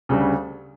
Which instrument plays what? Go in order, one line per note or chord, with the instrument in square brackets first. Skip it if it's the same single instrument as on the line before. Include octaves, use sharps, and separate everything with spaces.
[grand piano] D2 C#3 G3